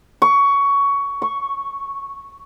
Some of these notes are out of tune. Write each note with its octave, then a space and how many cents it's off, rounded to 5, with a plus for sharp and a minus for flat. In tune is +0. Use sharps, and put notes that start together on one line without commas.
C#6 +15
C#6 -5